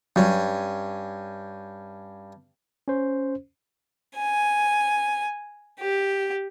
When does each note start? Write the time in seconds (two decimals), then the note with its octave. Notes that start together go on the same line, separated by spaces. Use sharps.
0.16 G2 F#3 G3 C#4
2.88 C#4 C5
4.17 G#5
5.80 G4